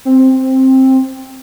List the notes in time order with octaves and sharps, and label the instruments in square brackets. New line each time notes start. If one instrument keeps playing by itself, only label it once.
[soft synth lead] C4